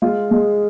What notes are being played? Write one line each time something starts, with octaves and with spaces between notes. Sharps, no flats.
G#3 F4
G#3